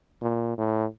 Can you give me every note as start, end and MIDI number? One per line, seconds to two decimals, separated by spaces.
0.22 0.53 46
0.58 0.86 45